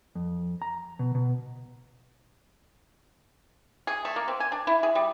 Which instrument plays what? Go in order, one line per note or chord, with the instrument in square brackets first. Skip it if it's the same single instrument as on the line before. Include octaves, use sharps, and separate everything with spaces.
[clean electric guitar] F2
A#5
B2
B2
[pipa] G#4
A3
A#3
C4
G#5
D4
E4
G#4
G3